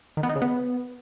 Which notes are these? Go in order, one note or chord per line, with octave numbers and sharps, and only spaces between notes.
D#3
B3
D#4
C#3
B3